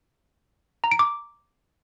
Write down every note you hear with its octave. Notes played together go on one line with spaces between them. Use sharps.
A#5
D7
D6